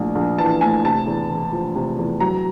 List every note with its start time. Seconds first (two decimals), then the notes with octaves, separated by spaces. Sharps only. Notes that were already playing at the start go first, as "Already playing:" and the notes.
Already playing: A#1 A2
0.15 A#1
0.38 E3 A5
0.61 A2 G#5
0.84 C3 A5
1.06 E2
1.29 E1
1.53 F3
1.75 C3
1.99 E2
2.20 F#3 A#5